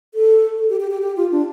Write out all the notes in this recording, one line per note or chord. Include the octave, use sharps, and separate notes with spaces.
A4
A4
G4
G4
G4
G4
F4
D4